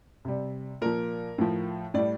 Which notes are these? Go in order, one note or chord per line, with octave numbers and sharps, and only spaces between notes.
C3 G3
A#2 F3 A#4
A2 F3
A2 G3 D5